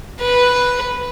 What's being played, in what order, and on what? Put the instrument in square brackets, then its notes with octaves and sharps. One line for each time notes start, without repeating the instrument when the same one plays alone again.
[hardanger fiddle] B4